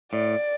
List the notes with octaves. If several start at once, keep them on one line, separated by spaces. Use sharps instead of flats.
A2 D5